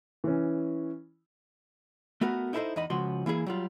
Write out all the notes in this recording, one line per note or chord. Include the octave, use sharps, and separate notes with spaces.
E3 C#4
A3 B3 F#4 A#4
D#4 E4 A4 B4 C5 D#5
E2 D#4 D#5 B5
C#2 F3 F#4 C6
E3 A#3 E4 G#4
F#3 G3 F4